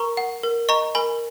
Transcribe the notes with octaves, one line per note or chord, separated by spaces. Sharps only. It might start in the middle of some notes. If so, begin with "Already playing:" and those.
Already playing: A#4 A#5 C#6
F#5
A#4
D#5 A#5 C#6
A#4 G#5 B5